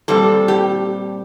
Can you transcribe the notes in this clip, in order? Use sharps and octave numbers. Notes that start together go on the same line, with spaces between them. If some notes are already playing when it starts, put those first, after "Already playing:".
A#2 G3 C4 A4
G4